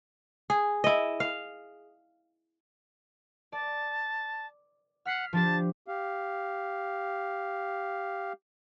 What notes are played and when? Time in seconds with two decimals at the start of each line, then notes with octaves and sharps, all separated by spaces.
0.50 G#4
0.84 E4 D#5
1.20 F5
3.52 D5 A5
5.06 F#5 F6 B6 C7
5.33 F3 D4 G4 A5
5.88 G4 F5